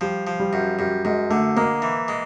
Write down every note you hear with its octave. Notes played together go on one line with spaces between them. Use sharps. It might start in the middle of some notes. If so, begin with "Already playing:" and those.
F3 G3
F3
G3
F#2
F#2 G3
F#2 G#3
D3 A3
G#3 A#3
E3
G#3